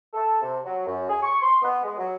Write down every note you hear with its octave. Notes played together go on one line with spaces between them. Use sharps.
A4
C3
F#3
F#2
G#4
C#6
C6
B3
G#3
F#3